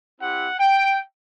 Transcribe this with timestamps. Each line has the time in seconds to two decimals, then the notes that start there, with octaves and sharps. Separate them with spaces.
0.21 C4 E4 G4 F#5
0.59 G5